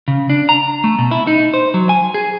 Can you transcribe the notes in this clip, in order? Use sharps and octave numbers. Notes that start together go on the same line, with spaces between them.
C#3
D4
A#5
A3
B2
E4
D#4
C5
F#3
G#5
G#4